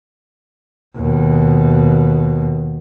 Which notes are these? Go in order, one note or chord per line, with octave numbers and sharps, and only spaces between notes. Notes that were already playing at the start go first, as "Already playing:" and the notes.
D#2 B2